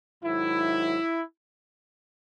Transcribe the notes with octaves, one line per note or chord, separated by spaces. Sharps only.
G#2 D#3 F#3 E4